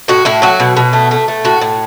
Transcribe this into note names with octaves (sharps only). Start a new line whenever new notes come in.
A2 F#4
A2 E4
F#3 F#4
B2
B2
A3
A3
A3
A2 F#4
A2